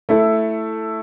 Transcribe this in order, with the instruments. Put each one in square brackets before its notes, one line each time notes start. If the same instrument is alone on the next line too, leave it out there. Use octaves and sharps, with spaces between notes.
[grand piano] A3 E4 A4